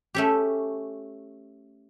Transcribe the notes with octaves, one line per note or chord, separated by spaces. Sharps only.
A3 C#4 G4